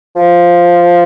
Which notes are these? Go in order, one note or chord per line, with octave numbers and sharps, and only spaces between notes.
F3